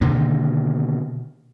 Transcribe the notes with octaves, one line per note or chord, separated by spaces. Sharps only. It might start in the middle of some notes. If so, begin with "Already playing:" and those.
B2 D3 D#3 A#3